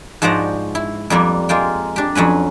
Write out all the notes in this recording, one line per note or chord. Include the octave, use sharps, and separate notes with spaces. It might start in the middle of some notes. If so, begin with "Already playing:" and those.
G#2 F3 F#4 C5 D5 A#5
E4
F2 G3 A#3 B3
G#3 A#3 F4 G5
D4 G4
F2 F#3 C#4 B4